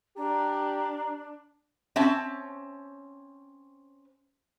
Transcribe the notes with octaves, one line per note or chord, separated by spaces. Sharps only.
D4 G4 A#5
C4 C#4 E5 A5